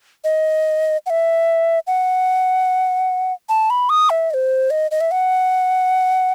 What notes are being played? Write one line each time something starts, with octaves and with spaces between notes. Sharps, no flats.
D#5
F#5
E5
F#5
A5
B5
D#6
E5
D#5
C5
D#5
D#5
E5
F#5